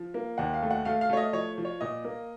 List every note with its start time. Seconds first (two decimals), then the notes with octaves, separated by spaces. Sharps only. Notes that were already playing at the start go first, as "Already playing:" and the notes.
Already playing: F3
0.14 A#3
0.38 D#2 F#5
0.54 F5
0.62 A3
0.71 F#5
0.85 A3 F5
1.01 F5
1.10 A3 C#5
1.17 D#5
1.33 F3 C#5
1.58 F3
1.65 C#5
1.81 A#2 D#5
2.04 A#3